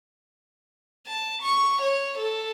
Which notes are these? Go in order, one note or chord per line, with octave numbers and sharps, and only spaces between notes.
A5
C#6
C#5
A4